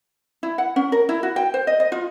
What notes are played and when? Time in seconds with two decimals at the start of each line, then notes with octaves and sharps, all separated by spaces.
0.43 E4
0.58 F#5
0.76 C#4
0.92 A#4
1.09 E4
1.23 F#4
1.36 G5
1.54 C5
1.67 D#5
1.80 D#5
1.92 F4